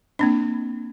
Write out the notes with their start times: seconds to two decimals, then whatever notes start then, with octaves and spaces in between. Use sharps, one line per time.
0.19 A#3 C4 D4